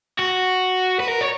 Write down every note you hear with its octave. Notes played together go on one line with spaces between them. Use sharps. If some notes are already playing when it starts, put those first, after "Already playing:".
F#4
B4
A#4
C#5